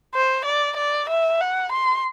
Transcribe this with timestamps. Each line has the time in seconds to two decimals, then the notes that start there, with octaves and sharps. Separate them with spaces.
0.14 C5
0.45 D5
0.77 D5
1.09 E5
1.41 F#5
1.72 C6